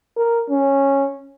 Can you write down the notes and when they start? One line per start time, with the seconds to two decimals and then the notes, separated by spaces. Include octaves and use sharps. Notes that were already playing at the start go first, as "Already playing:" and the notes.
0.17 A#4
0.50 C#4